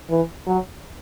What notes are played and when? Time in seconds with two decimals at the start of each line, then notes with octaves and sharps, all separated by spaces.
0.10 E3
0.47 F#3